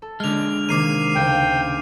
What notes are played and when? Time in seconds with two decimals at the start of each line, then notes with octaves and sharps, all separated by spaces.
0.02 A4
0.20 D3 G#3 F6 F7
0.69 C3 D#3 A#3 D6 C7 D#7
1.15 D2 C#3 F5 G5